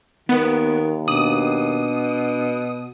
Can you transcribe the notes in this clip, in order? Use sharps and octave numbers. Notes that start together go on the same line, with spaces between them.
D#2 D#3 B3
B2 D4 D#6 D#7